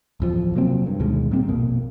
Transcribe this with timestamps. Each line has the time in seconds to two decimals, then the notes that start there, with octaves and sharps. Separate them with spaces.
0.20 D1 E2 F3
0.55 C3 F#3 A#3 C4
0.86 G2
1.00 D2 B2 D#3 G#3
1.31 A#2 G3 C4
1.48 A#1 F2 B2 A#3